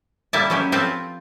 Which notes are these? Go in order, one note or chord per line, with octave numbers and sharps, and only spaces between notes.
D3 G3 A#3 E4 E5 A5
F#3 G#3 C#4 E4 G4
F3 C4 F4 A4 B4 A5